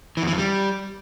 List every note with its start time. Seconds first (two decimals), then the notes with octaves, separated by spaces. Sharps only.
0.17 E3
0.22 E2
0.27 E3
0.33 F2
0.38 G3